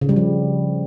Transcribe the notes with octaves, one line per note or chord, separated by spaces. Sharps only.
C#3
G3
F3